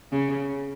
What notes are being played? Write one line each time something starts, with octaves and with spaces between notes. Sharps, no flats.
C#3